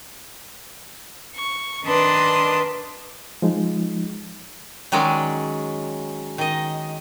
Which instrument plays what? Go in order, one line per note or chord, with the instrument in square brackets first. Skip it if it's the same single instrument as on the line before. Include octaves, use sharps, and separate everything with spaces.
[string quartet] C#6
D#3 D4 B4 A5 C6 D#6
[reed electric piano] F3 G#3 D#4
[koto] D#3 F#3 G#3 C#4 D5
D#3 D#5